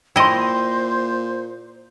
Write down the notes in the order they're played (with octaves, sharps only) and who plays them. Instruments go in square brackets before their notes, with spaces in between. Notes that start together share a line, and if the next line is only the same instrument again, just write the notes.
[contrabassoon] A#2 [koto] E4 D#5 [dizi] C5 [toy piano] G5 C6